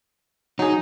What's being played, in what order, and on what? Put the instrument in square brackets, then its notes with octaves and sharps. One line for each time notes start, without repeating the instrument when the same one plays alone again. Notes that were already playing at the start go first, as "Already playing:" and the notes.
[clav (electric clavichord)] F#3 G#4 [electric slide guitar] D#4